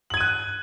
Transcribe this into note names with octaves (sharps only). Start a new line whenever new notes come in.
F#6 G#6 D#7 F#7